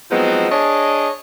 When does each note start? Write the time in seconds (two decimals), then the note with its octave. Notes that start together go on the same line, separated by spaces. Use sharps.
0.11 F3 F#3 G#3 B3 C4 D#4
0.50 D4 G#4 C#5 D#5